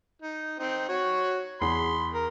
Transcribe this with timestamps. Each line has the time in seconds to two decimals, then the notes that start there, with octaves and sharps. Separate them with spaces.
0.22 D#4
0.59 C4 D#4
0.89 F#4 C#5
1.61 E2 G#4 B5 C6 C7
2.14 A#4